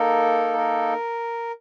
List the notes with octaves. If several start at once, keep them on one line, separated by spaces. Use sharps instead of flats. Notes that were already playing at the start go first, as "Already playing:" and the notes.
Already playing: A#3 D#4 A4 A#4
A#4